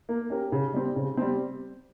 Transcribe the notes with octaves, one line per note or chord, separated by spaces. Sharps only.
A#3
C#4 G4 A#4
C#3
G3 C4
C#3
G3 C4